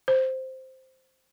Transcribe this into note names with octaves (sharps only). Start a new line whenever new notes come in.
C5